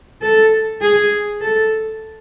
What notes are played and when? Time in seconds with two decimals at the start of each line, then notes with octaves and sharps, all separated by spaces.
0.22 A4
0.81 G#4
1.41 A4